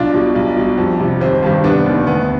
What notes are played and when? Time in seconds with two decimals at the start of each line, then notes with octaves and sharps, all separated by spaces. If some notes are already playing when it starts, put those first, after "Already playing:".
Already playing: B1 D4 F4
0.14 B2 G3
0.35 B1
0.56 B2 G3
0.78 F2
1.00 C3 G3
1.21 G#1 C4
1.42 G2 D#3 G3
1.64 F1 B3 D4
1.86 D#2 D#3
2.07 D2 B3